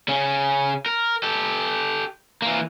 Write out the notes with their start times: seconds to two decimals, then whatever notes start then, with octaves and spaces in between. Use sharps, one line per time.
0.08 C#3 C#4
0.86 A#4
1.23 G4 A4
2.42 E3 A#3